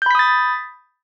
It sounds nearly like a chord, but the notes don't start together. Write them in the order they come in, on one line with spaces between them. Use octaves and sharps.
G6 B5 B6 D#6 A6